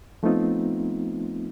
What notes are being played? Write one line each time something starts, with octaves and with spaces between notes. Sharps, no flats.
F3 A3 B3 C4 D#4 F4